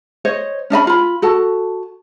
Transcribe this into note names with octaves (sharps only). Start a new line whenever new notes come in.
C5 C#5 D#5
C#4 D4 D#5 B5
F4 B5
F#4 A4 A5